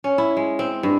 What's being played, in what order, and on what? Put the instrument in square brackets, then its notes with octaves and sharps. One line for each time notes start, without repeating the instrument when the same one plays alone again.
[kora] C#4
E4
G#3
C4
G2